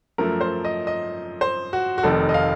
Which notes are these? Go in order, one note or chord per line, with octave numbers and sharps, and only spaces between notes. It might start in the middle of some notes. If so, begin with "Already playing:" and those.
F#2 F3 A3 A#4
C5
D#5
D#5
C5
F#4
F#4
F1 F2 D#3 A4
D#5
F5